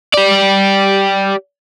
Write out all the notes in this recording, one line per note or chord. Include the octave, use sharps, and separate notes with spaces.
G4 D5